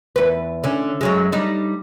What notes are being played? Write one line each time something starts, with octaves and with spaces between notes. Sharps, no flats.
E2 B4
D3 C#4
F#2 F#3 G#3
G3 D4 D#4